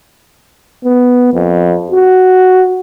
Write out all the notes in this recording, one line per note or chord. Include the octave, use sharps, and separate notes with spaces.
B3
F2
F#4